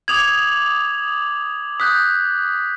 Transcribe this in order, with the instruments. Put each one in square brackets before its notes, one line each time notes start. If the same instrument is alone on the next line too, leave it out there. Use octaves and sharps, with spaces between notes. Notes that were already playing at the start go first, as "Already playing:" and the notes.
[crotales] D6 D#6 F#7 [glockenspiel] G#6 F7
[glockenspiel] D#6 F#6 G6 [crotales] B6